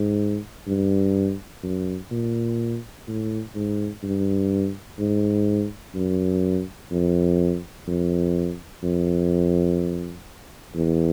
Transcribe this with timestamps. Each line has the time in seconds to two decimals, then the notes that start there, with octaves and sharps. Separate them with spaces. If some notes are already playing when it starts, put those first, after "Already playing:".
Already playing: G#2
0.67 G2
1.63 F#2
2.11 A#2
3.08 A2
3.55 G#2
4.03 G2
4.99 G#2
5.95 F#2
6.91 F2
7.87 F2
8.83 F2
10.75 E2